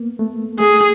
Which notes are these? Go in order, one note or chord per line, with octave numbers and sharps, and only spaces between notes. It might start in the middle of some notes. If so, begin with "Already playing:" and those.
Already playing: A#3 B3
A3
A3 G#4